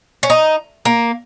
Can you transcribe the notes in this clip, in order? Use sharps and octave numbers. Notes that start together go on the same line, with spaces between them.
C#4
D#4
A#3